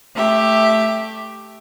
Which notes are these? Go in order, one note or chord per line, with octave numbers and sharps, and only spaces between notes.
A3 G4 E5